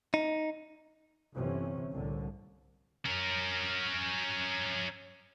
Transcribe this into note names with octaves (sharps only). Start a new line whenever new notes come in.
D#4
G1 C3 E3 C#4
C2 A2 D3
C#4 A#4